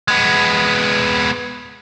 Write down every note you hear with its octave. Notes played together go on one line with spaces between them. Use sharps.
G#3 B3